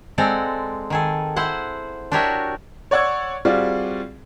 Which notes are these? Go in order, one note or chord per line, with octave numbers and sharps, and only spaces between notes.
G#3 C4 A4 D5 F#5 A#5
D#3 G#4 A4
E4 C5 F#5
D4 F#4 G4 A#4 C#5 E5
C#5 D5 F#5 C#6 E6 G#6
G3 C4 F4 F#4 G#4 D5